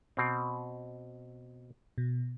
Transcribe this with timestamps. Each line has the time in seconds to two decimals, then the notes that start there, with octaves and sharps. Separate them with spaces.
0.17 B2 C4
1.98 B2